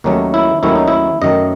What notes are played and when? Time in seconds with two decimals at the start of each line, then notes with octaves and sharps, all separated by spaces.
0.04 D#2 D#3 F#3 A3 C#4
0.34 E4
0.63 D#2 D#3 F#3 A3 C#4 E4
0.75 D#4
0.88 E4
1.22 F#2 D#3 A3 D#5